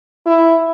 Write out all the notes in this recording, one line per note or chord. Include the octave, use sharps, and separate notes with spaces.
E4